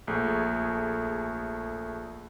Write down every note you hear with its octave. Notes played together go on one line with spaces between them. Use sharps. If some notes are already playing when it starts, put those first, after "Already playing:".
A#1 A3 G#4